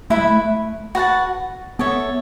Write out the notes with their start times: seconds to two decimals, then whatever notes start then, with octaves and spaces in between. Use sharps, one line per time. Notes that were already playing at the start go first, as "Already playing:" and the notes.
0.10 A3 E4 B4 E5 B5
0.17 G#3
0.25 A3
0.95 F#4 B4 F#5 A5
1.79 B3 A4 C#5 E5